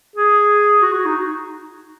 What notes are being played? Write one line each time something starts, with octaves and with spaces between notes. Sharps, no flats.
G#4
F#4
F#4
D#4